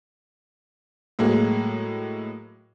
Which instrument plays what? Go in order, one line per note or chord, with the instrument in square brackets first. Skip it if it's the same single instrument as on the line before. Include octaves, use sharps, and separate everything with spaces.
[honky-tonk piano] A2 F#3 G#3 A#3